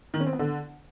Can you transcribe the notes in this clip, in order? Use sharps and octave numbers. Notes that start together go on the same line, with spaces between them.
D#3
C#4
C4
B3
D3